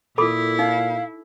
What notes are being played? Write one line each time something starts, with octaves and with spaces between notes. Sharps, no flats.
A#2 E4 A4 B5 D6
D#4 F5